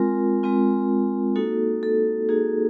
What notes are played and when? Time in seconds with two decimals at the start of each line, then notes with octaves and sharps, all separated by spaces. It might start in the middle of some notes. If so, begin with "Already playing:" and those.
Already playing: G#3 C4 F4 A#4
0.43 G#3 C4 F4
1.36 A#3 D#4 F#4 A4
1.83 A4
2.29 A#3 D#4 F#4 G#4